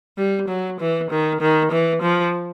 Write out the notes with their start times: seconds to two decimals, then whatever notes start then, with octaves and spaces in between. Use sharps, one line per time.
0.18 G3
0.48 F#3
0.80 E3
1.11 D#3
1.41 D#3
1.72 E3
2.02 F3